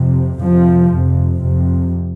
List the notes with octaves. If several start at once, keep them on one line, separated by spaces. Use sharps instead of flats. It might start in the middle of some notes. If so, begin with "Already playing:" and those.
Already playing: F2 C3
F2 C3 F3
F2 C3
F2 C3